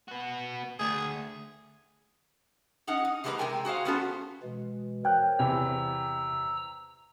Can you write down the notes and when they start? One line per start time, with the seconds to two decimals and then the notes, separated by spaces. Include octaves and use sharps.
0.08 B3 F#4
0.79 D2 G#4
2.87 C#4 D#4 D#5 F#5
3.05 D#4
3.24 E3 G3 G#3 A#3 B4 A#5
3.38 C3 G#3 A#4 G5 G#5 A#5
3.65 F#4 G#4 C5 F5
3.85 A3 B3 C#4 F4 F#4 A4
4.43 B2 E3 G#3
5.05 A#4 C5 C#5 G5 F#6
5.39 E2 C3 E3 A#5 E6